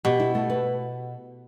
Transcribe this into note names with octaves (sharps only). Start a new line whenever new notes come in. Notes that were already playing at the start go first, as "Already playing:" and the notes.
B2 G4
E4
A3
B4